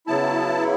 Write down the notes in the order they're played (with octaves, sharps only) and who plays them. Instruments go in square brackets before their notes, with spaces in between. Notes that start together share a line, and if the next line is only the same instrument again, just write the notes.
[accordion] C#3 F#3 B3 E4 A5